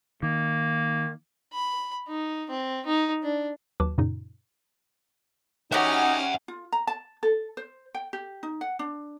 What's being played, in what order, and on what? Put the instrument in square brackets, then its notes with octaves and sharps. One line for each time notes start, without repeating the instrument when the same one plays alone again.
[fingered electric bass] D#3 [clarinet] A#3
[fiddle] B5
D#4
C4
D#4
D4
[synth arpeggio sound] D#2 F#3 F#4 B4 A5 D6
F#2 A#2 C#3 D#4
[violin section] C#4 C#5 F6 [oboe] D#4 [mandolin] F#4 G4 [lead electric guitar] E5 F#5
[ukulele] F4
A#5
A5
A4
C5
G5
G4
D#4
F#5
D4